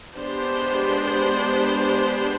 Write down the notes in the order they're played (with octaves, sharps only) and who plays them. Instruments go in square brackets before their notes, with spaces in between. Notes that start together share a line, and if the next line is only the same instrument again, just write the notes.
[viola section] G#3 B3 D4 G4 C5